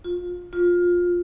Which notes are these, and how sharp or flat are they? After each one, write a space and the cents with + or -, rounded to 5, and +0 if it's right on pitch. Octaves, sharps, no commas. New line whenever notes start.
F4 +25
F4 +15